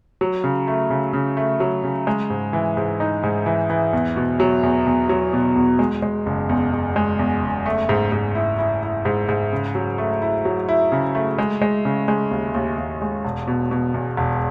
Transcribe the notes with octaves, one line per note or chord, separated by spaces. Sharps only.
F#3
C#3
A3
C#3
C#3
A3
F#3
C#3
G#3
G#2
E3
G#2
D#4
G#2
E3
E3
E2
B2
F#3
E2
E2
F#3
B2
E2
G#3
G#3
F#1
E2
F#1
G#3
E2
F#1
A3
G#2
G#2
E4
E4
E4
G#2
G#2
C#3
F#3
A3
E4
F#3
E4
C#3
A3
G#3
G#3
C#3
G#3
D#2
D#2
D#2
G#3
E1
B2
B2
E2
E1